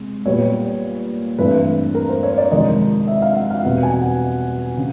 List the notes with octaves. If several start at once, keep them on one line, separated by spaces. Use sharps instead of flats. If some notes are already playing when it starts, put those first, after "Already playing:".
Already playing: C3 G#3
A#2 G3 B3 C#5
G2 E3 A3 C4 B4
A#4
C5
C#5
D5
F2 C3 D#3 G#3 D#5
E5
F5
F#5
F5
E2 B2 G3 C4 F#5
G#5
F#5
C#3